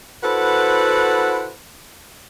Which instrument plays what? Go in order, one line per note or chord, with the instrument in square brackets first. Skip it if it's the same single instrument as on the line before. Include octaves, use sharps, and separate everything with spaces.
[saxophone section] E4 F#4 A4 B4 C5 F#5